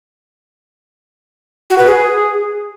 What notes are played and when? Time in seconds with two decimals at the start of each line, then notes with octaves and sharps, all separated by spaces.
1.70 F#4
1.78 B4
1.86 G#4